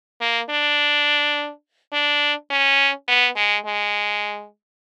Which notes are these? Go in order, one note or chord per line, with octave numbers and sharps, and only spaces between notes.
A#3
D4
D4
C#4
B3
G#3
G#3